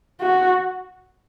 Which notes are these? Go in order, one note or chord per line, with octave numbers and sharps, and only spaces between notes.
F#4